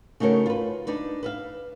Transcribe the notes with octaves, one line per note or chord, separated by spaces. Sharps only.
C#3 A3 D#4 F#4 A#4 C#5
F4 B4
D4 D#4 B4
B4 E5 F5